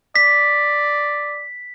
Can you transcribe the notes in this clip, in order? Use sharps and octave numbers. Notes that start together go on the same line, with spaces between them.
D5 B6